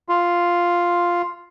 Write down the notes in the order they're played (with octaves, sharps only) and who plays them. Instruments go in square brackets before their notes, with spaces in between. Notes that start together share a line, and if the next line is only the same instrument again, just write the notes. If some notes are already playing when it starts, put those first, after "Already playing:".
[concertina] F4